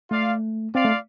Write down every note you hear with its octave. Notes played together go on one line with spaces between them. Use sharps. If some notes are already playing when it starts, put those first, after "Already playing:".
A3 F4 D5 F5
C4 F4 D5 F5
A3